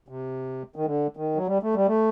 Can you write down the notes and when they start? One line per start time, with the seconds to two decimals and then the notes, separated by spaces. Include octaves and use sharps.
0.08 C3
0.76 D#3
0.85 D3
1.17 D#3
1.36 F#3
1.47 G3
1.63 A3
1.75 G3
1.87 A3